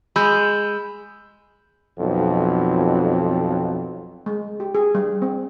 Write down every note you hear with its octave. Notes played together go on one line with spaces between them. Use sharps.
G#3 B5 E6 G6
B1 F2
G#3
G4
G#4
G3
C4